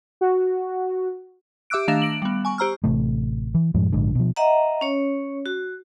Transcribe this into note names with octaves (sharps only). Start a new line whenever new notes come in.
F#4
G4 E5 D6 E6 F#6 D7
D#3 A3 D4 F5 A#6 E7
D7 F#7
G3 B3
G#5 C#6
G4 C5 A#5 E6 F6
A1 C3 A3
E3
F#2 A2 F3 G#3
A#1 G#2 D3
B2 F3
D#5 E5 F#5 A#5
C#4 C#5
F#4